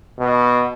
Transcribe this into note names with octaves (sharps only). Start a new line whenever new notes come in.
B2